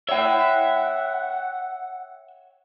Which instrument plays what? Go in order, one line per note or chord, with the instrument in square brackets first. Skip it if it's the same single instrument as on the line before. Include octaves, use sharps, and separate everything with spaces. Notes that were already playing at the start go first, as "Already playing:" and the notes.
[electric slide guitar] C#5 G5 [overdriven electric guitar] E5 [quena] F#5